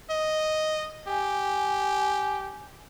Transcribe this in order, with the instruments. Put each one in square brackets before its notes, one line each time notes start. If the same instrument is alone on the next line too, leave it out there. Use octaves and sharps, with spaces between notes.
[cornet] D#5
[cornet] G4 [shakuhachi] G#5